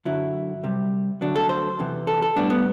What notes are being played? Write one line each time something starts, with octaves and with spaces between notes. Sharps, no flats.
F#2 D3 F#3 E4
C2 C3 G3
D2 D3 F#3 D4
A4
C5
E2 C3 E3
A4
A4
A2 G3 B3 D4
B3